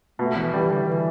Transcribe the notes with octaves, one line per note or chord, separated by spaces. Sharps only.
B2 A3
E3
E3 G3
D3
E3